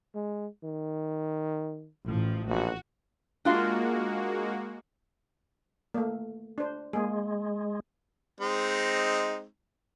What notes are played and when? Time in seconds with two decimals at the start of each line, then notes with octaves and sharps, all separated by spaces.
0.15 G#3
0.64 D#3
2.07 A1 F3
2.48 A#1 F#4
3.45 G#3 A#3 D4 F4 F#4 F5
5.94 A3 A#3
6.58 D4 C5
6.93 G#3 A#3 G#4
8.40 G#3 C4 D#4